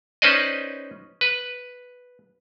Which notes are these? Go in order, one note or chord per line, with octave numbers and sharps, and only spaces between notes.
C#4 D#4 B4 C5 D5 D#5
B4